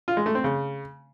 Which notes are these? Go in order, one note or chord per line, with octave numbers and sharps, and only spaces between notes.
F4
G#3
A3
C4
C#3